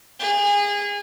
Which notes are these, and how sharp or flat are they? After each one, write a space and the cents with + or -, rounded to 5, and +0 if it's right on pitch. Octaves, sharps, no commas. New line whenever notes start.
G#4 -25